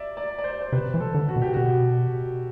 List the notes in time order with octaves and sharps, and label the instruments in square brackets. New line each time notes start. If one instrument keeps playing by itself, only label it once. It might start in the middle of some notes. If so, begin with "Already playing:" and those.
Already playing: [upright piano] D5 E5
D5
D5
C5
C5
[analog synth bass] C3 [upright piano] B4
[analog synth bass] E3
[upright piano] A4
[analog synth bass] D3
[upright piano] F#4
[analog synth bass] B2
[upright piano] G4
[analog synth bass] B2 [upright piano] F#4